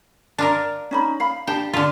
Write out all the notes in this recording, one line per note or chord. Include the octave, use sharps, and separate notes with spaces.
D4 F4 A#4
C#4 D#4 B5
F5 B5
D4 G4 G5 A5
D3 F4